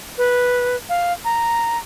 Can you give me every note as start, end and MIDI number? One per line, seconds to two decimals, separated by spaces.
0.18 0.76 71
0.89 1.13 77
1.25 1.78 82